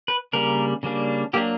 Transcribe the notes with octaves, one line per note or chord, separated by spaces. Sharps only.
B4
C#3 G3 A#3 D4 A#4
C#3 G3 A#3 D4
F#3 A#3 D4 G4